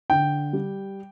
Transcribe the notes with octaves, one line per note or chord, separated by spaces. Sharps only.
D3 G5
G3